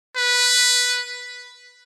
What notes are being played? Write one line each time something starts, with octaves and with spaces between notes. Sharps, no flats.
B4